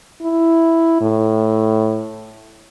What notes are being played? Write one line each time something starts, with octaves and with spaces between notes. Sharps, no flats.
E4
A2